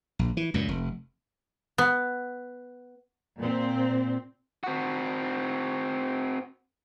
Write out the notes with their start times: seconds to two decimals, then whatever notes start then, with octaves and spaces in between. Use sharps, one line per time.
0.19 A#1
0.37 E3
0.54 C#2 F#2 A#2
0.68 F1
1.78 B3
3.40 A#2 C4
4.64 C4 F#4